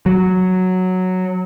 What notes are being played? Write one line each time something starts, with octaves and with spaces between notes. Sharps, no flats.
F#3